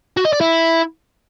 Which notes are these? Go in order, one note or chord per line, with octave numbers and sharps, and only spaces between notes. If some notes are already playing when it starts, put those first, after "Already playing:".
F#4
D#5
D5
E4